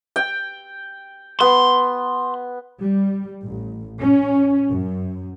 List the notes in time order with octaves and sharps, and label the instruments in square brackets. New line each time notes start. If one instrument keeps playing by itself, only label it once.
[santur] G5
[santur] B3 [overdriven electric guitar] C6
[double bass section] G3
A1
C#4
F#2